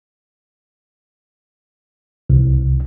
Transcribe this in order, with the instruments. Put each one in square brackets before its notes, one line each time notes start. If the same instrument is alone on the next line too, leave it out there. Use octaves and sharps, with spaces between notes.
[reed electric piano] C2